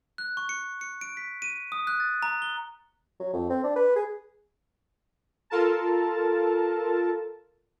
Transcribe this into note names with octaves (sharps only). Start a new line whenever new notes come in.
F#6
C#6
C#7
C#7
D7
B6
D#7
D#6
F#6
A6
A#5
G7
F#3
F2
C4
D4
B4
G#4
F4 A4 A#4 A5